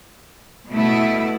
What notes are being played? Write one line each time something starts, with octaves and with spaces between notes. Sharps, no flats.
B2 A3 E4